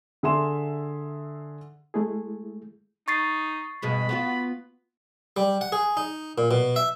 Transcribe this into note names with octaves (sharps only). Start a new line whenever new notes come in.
D3 G#4 E5 C6 E7
G#3 A3 E4 G#4
D#4 C#6 A6 C7
G2 B2 G#3 B5
B3 F4 F#4
G3
F#5
G#4
D#4
A#2
B2
E5